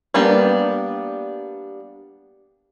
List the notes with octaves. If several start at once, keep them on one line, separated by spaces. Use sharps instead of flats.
G3 A#3 B3 D4 G4